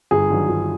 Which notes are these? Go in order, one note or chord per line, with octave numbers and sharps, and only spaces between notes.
G1 G#4
G2 D#3 F#3
G1